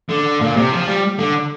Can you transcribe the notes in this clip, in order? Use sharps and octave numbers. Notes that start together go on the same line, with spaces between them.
D3
A#2
C3
F3
G3
D3